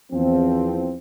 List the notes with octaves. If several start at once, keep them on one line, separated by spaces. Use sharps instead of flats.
E2 F3 C4